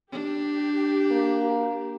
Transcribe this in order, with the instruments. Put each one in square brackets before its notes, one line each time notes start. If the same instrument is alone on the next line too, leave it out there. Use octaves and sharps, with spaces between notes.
[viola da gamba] D4 [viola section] G4
[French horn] A#3